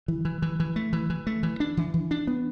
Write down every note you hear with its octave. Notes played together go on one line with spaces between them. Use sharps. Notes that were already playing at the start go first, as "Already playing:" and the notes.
E3
E3
E3
E3
A3
E3
E3
A3
E3
D4
E3
E3
D4
B3